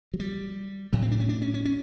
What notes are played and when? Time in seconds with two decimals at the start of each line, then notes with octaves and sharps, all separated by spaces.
0.14 F#3
0.20 G3
0.93 A2 F#3
1.02 C4
1.11 D4
1.20 C#4
1.29 D4
1.42 C#4
1.54 C#4
1.65 C#4